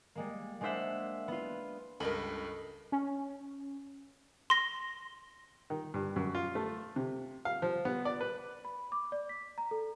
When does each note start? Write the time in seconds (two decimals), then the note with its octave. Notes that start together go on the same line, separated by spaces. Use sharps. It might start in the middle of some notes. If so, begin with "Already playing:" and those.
0.15 G3 G#3 A#3
0.61 G#3 A#3 D4 C5 E5 F#5
1.28 B3 F4
2.00 C#2 G2 A4 A#4 D#5 B5
2.92 C#4
4.50 C6 A#6
5.70 D#3
5.94 G2
6.16 F#2
6.35 F4
6.55 A3
6.96 C3
7.45 F5
7.62 F3
7.85 B3
8.05 D5
8.21 B4
8.65 B5
8.92 D6
9.12 D5
9.29 B6
9.58 A#5
9.71 A4